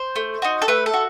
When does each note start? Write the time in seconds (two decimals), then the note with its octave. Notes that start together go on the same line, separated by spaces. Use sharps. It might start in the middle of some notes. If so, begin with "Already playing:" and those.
Already playing: C5
0.16 A3
0.42 D#4 F#4
0.62 A4
0.68 A3 B4
0.86 A4
0.94 F#4